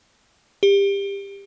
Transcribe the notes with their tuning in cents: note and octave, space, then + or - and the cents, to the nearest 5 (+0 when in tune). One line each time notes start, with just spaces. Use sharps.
G4 +25